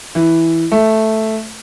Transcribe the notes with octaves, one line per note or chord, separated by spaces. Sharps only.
E3
A3